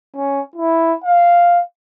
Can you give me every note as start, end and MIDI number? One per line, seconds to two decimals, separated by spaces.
0.16 0.41 61
0.56 0.93 64
1.04 1.60 77